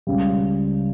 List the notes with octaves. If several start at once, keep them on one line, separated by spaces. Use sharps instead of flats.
C#2 C#3 G3